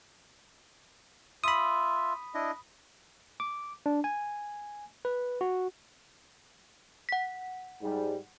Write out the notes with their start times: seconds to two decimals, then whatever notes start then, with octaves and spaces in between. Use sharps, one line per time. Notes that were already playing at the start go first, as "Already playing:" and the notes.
1.44 F4 E5 B5 D#6
2.34 D4 E4 D#5
3.40 D6
3.86 D4
4.04 G#5
5.05 B4
5.41 F#4
7.09 F#5 B6
7.82 G#2 G3